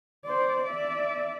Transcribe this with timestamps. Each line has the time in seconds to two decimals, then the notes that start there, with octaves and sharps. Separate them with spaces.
0.24 C5 D5
0.63 D5 E5